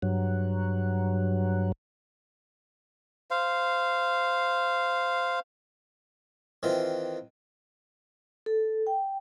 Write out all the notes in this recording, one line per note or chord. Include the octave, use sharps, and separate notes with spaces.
G2 F#3
C5 F5
D#3 E3 C4 F4
A4
G5